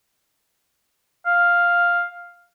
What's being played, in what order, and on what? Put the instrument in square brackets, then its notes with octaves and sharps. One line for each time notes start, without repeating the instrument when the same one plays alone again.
[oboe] F5